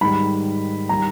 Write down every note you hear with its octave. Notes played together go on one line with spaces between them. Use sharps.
G#2 D#3 G3 B5
D#3 G3 A#5